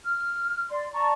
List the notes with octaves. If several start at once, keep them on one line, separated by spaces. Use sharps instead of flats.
F6
D5 C6
D5 A5 A#5 C#6